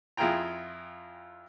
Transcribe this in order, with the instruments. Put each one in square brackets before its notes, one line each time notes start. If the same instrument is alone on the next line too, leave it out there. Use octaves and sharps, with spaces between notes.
[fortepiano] F2 E4 F4 G#4 G5 A#5